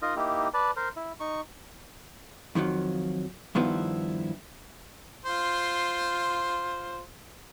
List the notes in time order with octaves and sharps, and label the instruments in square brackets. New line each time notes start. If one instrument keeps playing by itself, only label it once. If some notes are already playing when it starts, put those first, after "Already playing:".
[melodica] D#4 F4 A#4 D#5
A#3 D#4 E4 G4
B4 D5 A5
A#4 C5
E4
D#4 C#6
[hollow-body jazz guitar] F2 D#3 F3 F#3
G2 D#3 F3 B3 E4 F4
[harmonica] F4 C5